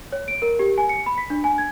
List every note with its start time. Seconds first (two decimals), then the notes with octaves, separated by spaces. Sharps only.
0.12 C#5
0.28 D7
0.42 A#4
0.59 G4
0.78 G#5
0.89 C#7
1.06 B5
1.18 B6
1.30 D4
1.44 G#5
1.58 G#6